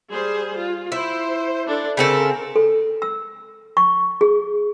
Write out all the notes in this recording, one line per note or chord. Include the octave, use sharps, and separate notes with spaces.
G3 G#4 C5
F4
E4 C5
D4 A4
C#3 C4 A4 A#4
A4
E6
C#6
G#4